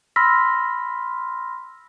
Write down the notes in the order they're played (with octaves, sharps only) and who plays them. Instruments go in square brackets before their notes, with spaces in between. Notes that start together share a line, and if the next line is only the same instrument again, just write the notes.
[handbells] B5 C6 E6 F6 A#6 B6